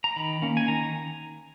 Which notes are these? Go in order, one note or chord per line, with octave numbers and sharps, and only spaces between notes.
A#5
D#3 B5
A#3 C#4
G#5
D#3 A#5